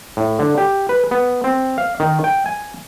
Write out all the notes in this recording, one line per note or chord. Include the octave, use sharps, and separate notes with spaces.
A2
D3
G4
B4
B3
C4
F5
D#3
G5
G#5